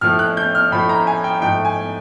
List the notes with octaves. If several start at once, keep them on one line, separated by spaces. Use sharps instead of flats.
A2 F3 A3 F6
F#6
G6
F6
A2 F3 A3 B5
A#5
G#5
G5
G#2 F3 A3 G5
G#5